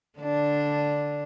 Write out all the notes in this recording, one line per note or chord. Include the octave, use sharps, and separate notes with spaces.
D3 D4